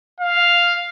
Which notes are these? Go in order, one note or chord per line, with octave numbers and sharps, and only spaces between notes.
F5